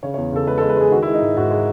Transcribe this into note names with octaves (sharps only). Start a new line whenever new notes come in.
C#3 C#5
C#5
E2
C#3 A4
G#3 B4
A4
G#3
B4
G#3 G#4
D#3 F#4
E4
G#3
D#4
G#2
G#2 F#4
G#3